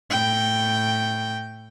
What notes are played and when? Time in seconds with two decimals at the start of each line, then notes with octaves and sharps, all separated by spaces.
0.11 A2 G5